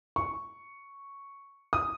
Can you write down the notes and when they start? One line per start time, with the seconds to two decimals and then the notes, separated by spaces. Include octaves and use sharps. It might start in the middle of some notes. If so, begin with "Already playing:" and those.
0.16 C#6
1.73 D#6